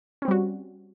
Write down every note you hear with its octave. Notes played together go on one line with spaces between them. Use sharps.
G3 C4 C#4 F#4